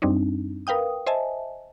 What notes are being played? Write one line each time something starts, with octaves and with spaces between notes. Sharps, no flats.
F#2 G3 C4 D4 D#4
A#4 B4 F5 G5 D#6
C5 D#5 E5 G#5 A5